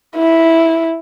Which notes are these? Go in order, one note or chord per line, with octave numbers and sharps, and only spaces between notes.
E4